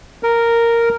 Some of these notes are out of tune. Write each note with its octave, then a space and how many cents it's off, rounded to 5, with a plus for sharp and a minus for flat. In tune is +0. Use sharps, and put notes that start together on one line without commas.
A#4 -5